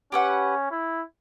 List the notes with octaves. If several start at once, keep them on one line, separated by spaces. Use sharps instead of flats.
C#4 G4 B4 F#5
E4